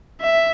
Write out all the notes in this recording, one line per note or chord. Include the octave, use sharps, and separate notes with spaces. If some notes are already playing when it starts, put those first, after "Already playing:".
E5